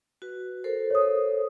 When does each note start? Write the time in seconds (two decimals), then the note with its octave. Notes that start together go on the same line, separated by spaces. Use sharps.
0.22 F#4 B4
0.64 A4 A#4 C5
0.90 C#5 D#6